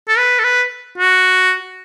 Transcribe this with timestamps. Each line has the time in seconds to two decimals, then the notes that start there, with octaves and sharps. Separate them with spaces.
0.08 A4
0.18 B4
0.39 A4
0.44 B4
0.98 F#4